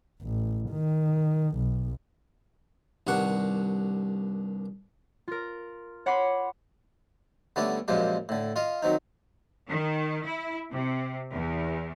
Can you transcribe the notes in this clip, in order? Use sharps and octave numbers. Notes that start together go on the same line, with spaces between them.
A1
D#3
B1
C2 G2 D#3 D4 F#5 C#6
F4 A#4
C#5 F#5 B5 C6 D6 C7
D3 G3 A3 B3 C#4 D4
A#1 F#2 A#2 F3 G#3 G4
A2 D3
F4 D#5 F5
D#3 F#3 C4 D#4
D#3
E4
C3
E2